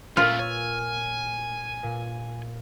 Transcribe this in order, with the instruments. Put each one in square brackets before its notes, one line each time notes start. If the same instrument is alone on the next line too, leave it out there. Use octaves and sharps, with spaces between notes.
[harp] A#2 A#4 B6 [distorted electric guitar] C#3 A3 [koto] F4 [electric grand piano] F6
[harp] C#5 E6 [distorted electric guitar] G#5
[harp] A#2